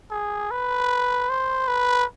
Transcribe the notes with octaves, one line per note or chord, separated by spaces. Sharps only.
G#4
B4
C5
B4